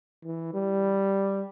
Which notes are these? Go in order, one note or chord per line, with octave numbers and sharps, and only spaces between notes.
E3
G3